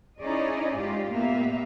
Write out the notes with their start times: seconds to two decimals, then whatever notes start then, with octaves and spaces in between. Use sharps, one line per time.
0.19 C#4 D#4 E4 G#4 D5 D#5
0.76 G#2 G#3 F4 G4
1.11 A#2 A#3 B3 G4 E5 F5